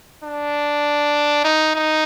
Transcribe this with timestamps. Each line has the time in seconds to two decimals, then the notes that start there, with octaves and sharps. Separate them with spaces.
0.24 D4
1.44 D#4
1.75 D#4